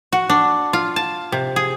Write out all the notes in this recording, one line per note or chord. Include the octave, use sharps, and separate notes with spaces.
F#4
D4
F4
A5
C3
G#4